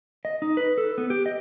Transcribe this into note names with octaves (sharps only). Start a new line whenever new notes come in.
D#5
D#4
B4
A4
B3
G4
D#5